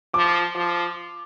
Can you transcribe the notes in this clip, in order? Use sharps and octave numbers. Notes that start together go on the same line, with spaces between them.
F3 D6
F3